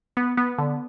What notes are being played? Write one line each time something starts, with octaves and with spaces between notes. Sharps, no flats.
B3
B3
D3